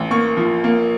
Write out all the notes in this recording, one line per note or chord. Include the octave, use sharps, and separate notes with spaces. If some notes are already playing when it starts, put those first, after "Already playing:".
Already playing: A1
A#3 C#6
F3
A#3